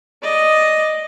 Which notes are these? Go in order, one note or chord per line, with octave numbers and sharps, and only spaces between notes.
D5 D#5